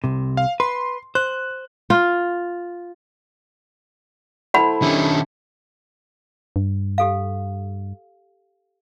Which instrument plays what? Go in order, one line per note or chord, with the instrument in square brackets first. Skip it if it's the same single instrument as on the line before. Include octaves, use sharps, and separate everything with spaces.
[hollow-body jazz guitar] C2 C3
[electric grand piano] F5
[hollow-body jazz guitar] B4 [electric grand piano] C6
[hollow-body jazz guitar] C5 [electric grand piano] F#6
[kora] F4
[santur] A3 E4 C5 [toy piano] F#5 B5
[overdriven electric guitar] D#3 C#4 [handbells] D4 G4 E5
[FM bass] G2
[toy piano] G4 A4 F5